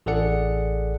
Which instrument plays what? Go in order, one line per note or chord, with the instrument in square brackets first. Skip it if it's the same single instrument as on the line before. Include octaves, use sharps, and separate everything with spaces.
[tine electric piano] A1 G#4 A4 D5 F#5 C#7